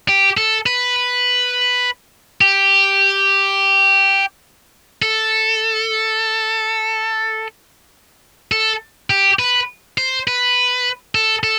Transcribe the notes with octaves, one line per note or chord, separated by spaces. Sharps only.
G4
A4
B4
G4
A4
A4
G4
B4
C5
B4
A4
A4